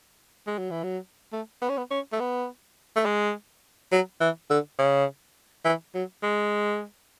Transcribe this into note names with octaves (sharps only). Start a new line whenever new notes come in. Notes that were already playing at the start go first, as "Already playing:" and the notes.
G#3
F#3
E3
F#3
A3
B3
C#4
B3
C#4
A3
B3
A3
G#3
F#3
E3
D3
C#3
E3
F#3
G#3